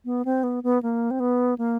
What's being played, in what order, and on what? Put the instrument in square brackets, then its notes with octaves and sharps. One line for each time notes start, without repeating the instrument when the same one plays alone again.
[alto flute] B3
C4
B3
B3
A#3
C4
B3
A#3